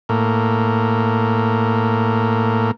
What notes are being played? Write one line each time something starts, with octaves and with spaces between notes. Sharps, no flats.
A2 A#3